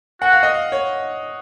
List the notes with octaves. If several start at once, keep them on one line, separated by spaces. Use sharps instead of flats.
F#4 F#5
F5
D#5
F5
C#5